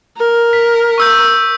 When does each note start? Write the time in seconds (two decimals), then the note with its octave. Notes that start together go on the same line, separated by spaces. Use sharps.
0.18 A#4
0.53 B6
0.98 C#6 E6 G6